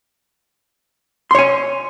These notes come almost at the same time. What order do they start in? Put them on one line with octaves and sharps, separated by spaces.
C6 C#5 G#5